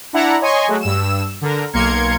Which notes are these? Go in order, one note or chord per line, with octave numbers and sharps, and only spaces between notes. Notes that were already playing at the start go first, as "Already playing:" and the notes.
D4 E4 F#5 A#5
C#5 D#5 G#5 C6 C#6
F#3 G#3 A3 F#4
G2 E6 E7
D3 A#4
B1 A#3 A#4 C6 G#6 C#7